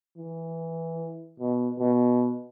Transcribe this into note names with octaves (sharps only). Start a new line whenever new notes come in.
E3
B2
B2